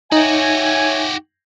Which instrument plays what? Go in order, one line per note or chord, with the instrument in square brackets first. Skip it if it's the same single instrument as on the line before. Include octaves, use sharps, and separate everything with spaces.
[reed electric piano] D#4 [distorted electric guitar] F#4 G4 [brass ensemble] C#5 E5 G#5